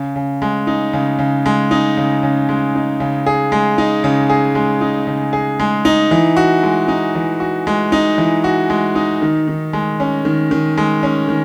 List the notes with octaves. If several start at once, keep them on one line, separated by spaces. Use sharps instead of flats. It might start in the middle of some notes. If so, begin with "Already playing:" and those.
Already playing: C#3
C#3
G#3
D#4
C#3
C#3
G#3
D#4
C#3
C#3
G#3
D#4
C#3
G#4
G#3
D#4
C#3
G#4
G#3
D#4
C#3
G#4
G#3
D#4
E3
F#4
G#3
D#4
E3
F#4
G#3
D#4
E3
F#4
G#3
D#4
D#3
D#3
G#3
C#4
D#3
D#3
G#3
C#4
D#3